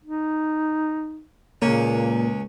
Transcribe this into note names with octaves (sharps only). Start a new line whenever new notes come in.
D#4
C#2 A#2 A#3 C#4